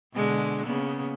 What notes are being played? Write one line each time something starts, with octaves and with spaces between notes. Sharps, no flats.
B2 D3 G#3
C#3 A#3 B3